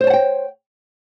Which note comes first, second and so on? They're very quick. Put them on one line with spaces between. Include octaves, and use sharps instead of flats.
C5 C#5 A5 F#5 G5